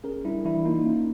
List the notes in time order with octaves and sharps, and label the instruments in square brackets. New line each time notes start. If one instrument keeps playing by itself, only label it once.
[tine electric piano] C#4 G#4 A#4
G3 D4 E4
E3 D4 E4
A#3 D#4 F4
C#4